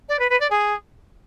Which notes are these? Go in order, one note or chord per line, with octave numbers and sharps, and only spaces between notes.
D5
B4
B4
D5
G#4